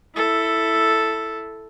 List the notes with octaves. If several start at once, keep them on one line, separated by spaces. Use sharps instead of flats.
E4 A4